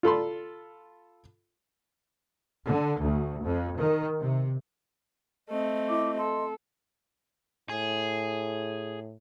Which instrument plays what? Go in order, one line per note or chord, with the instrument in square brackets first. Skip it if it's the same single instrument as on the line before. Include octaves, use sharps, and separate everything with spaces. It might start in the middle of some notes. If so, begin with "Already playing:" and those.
[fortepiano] F4 A4 B5 C6
[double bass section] D3
D2
F2
D#3
C3
[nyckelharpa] A3 C4 [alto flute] D#5
[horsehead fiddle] E4 [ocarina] D6
[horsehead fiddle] A4 [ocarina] C6
[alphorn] A2 [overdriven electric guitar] G#4